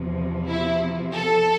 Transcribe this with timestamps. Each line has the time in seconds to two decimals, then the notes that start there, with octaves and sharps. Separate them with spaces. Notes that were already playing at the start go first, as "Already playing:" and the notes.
Already playing: E2 C3 F3
0.48 E4
1.13 A4